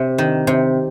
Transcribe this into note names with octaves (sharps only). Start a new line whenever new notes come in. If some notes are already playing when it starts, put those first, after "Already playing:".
Already playing: C3
D#3
C3